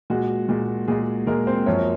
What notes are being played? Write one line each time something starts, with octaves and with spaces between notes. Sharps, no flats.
A#2 G#3 F#4
A#2 G#3
A#2 G#3 G#4
A#2 G#3 A#3 A#4
C4 C5
F#2 F3 A#3 C#4 C#5